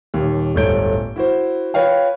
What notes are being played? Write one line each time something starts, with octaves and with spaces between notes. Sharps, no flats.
D#1 D#2
D1 G1 A3 C#5 G6 D7
E4 F#4 C5
F4 B4 C#5 F5 G5